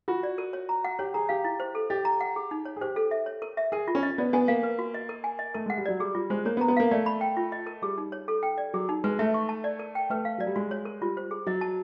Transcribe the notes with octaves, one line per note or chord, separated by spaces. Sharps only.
F4 F#4
D5
A#4
C#5
A#5
F#5
G4 C#5
G#4 A#5
G4 F5
E4
C5
A4
G4 D#5
A#5
F#5
G#4
D#4
C#5
G#4
G4 C5
A4
E5
C#5
A#4
E5
G#4 A#4
F4
C#4
D#5
B3 D5
B3 G#5
A#3 F5
B4
F#4
D#5
A#4
G#5
D#5
A3 A#4
G#3 F#5
G3
F#3 D5
G3 G#4
G3 F4
G#3 C5
A#3 C#5
B3
A#5
B3
A#3 F5
A3 D5
B5
G5
F4
D#5
A#4
G3 G#4
D#4
C#5
A4
G5
D5
F#3 G#4
D#4
G#3 B4
A3 E5
C#6
A5
D5
A#4
G5
A3 B4
F5
F#3 D5
G3
G#3 F#4
C#5
A#4
G3 F4
C5
G#4
F#3 D#5
A5